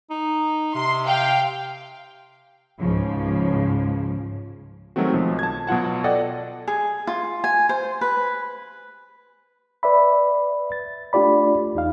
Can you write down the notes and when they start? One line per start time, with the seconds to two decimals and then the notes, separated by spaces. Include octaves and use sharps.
0.10 D#4
0.75 C3 C6
1.06 F5 G5
2.79 C#2 G#2 C#3 F3
4.96 D#3 F#3 G#3 A3 C4 F#4
5.13 B1 F3
5.39 A5 G#6
5.67 B2 F#3 F4 F#5 A5
6.04 A4 D5 D#5 F#5 G5
6.68 G#4
7.07 F4
7.44 G#5
7.69 C5
8.01 B4
9.83 B4 D5 E5 B5
10.72 A6
11.13 A3 D4 F4 G4 D5 B5
11.75 E2 D#4 F5